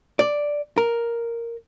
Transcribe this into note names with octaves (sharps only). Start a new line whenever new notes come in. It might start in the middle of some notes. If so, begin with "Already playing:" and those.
D5
A#4